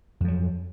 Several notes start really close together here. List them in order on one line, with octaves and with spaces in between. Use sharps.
F2 F3 F#3